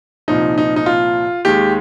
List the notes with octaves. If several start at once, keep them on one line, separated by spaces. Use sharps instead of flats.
C2 A#2 F3 D#4
D#4
D#4
F4
D#2 D#3 G#3 G4